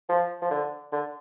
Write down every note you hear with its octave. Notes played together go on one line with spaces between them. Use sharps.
F3
F3
D3
D3